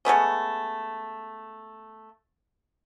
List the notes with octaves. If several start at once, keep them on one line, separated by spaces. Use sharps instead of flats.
G#3 A3 B3 C#4